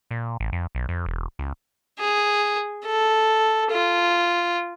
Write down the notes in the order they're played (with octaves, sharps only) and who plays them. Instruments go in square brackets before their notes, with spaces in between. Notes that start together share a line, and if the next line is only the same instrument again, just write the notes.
[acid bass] A#2
A1
F2
B1
F2
E1
C#2
[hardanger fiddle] G#4
A4
F4